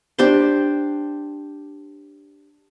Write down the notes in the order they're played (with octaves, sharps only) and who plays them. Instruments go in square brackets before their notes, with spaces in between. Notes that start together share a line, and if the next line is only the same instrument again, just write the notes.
[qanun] D4 G4 C5 C6